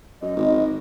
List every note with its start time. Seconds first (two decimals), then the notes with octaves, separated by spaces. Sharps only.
0.22 F#2 D#5
0.36 G#1